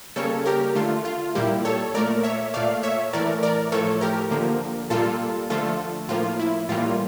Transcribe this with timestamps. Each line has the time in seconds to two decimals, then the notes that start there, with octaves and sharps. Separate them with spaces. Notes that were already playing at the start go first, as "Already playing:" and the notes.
0.16 C#3 G3 A#3 A4 C#5
0.46 G4 A#4
0.75 D3 A3 F4
1.05 F4
1.35 A#2 G3 A#3 E4 G4
1.65 A4 C#5
1.94 A#2 A3 A#4 D5
2.23 C#5 E5
2.54 A#2 A3 D5 F5
2.83 C#5 E5
3.13 A2 E3 A3 A#4 D5
3.43 A#4 D5
3.72 A2 F3 A3 A4 C#5
4.01 G4 A#4
4.31 D3 F3 A#3
4.90 A#2 G3 A#3 F4 A4
5.50 D3 F3 A3 F4 A4
6.09 A2 F3 A#3 F4
6.39 E4
6.69 A2 E3 G3 A#3 F4